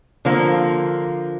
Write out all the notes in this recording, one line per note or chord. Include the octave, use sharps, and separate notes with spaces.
D3 F3 A#3